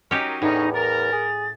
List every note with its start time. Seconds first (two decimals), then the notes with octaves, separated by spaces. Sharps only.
0.11 F#3 C#4 D#4 G4 A#4
0.42 E2 A2 D3 C#4 D#4
0.75 A#4 A6
1.13 G#4